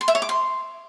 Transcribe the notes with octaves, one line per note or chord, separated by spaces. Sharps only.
C6
E5
C#5
D6
C6